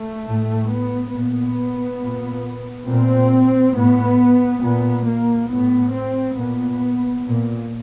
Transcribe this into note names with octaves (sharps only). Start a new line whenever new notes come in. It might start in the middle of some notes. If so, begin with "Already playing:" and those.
Already playing: A3
A2
B3
A#2 B3
A#2
A#2 C4
A2 B3
A#2 B3
A#3
A2 B3
C4
A#2 B3
A#2